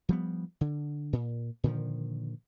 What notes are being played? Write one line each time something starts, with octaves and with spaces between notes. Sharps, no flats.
F3 G3 B3
D3
A#2
A#2 D3 D#3 F3